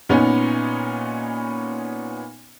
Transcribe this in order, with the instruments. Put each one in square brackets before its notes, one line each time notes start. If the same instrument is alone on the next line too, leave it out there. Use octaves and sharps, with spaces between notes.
[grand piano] A#2 B3 C#4 D#4